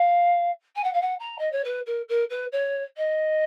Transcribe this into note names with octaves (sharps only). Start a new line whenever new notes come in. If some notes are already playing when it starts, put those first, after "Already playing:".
Already playing: F5
G#5
F#5
F5
F#5
A#5
D#5
C#5
B4
A#4
A#4
B4
C#5
D#5